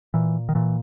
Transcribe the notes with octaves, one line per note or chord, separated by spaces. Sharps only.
A#2 E3
D#3
A#2 E3